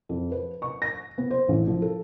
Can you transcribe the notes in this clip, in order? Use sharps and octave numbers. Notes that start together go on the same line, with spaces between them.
F2
B4
C#6
A#6
B3
C5
A1
F3
A4